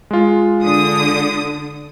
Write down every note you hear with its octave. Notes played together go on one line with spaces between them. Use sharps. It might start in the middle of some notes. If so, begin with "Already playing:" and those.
G#3 F4
D3 D#6